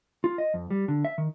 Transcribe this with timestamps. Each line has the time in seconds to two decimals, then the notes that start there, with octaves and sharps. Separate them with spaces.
0.24 F4
0.38 D#5
0.54 F2
0.70 G3
0.88 D3
1.05 E5
1.18 D#3